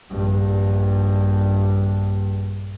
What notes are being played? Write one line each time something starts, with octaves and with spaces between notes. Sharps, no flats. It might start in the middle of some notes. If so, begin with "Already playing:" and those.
A#1 G2